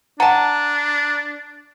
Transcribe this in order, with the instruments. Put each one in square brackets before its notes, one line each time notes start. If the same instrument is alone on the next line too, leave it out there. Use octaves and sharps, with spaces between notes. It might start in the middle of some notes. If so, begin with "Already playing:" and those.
[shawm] D4 [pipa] F#5 A5 [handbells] A#5